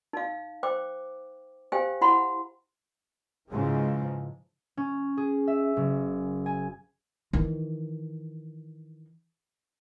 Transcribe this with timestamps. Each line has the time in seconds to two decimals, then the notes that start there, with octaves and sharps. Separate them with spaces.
0.13 D#4 F5
0.63 C5 G5 D6
1.72 G4 C5 F5 G5 G#5
2.01 E4 F#5 B5 C6
3.51 G#2 C#3 E3 F3 G#3
4.77 C#4
5.17 G#4
5.47 E5
5.77 F#1
6.46 G#5
7.33 D#3 E3